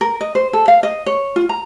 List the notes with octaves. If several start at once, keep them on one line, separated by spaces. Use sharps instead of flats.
A#4
D#5
C5
A4
F5
D#5
C#5
F4
A#5